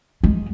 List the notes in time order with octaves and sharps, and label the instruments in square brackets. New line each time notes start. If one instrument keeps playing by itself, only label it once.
[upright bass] G#3